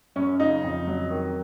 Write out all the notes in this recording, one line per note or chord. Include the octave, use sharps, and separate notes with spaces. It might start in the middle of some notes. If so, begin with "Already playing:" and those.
F#2 C#4
C#3 D#4
F2
F#3
D#3